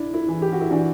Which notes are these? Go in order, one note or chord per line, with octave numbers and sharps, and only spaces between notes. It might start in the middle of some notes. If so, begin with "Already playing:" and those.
Already playing: D4 E4
E4
E3
G4
F#4
E4
E3 D4 F#4